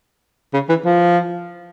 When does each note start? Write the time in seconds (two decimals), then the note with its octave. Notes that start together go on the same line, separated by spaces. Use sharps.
0.54 C#3
0.69 E3
0.85 F3